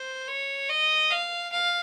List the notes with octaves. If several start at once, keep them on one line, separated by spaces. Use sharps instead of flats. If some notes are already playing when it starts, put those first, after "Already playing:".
Already playing: C5
C#5
D#5
F5
F5